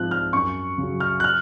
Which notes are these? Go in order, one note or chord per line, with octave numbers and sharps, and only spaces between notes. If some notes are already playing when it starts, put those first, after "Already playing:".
Already playing: G#2 F3 C4 F#6
F6
F#2 C#6
C#3 F#3
F6
F#6
F6